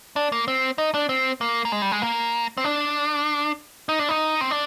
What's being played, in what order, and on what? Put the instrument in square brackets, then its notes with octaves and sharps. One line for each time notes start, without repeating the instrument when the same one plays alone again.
[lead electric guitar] D4
A#3
C4
D#4
D4
C4
A#3
A#3
G#3
G3
G#3
A#3
C4
D4
D#4
D4
D#4
C4
D4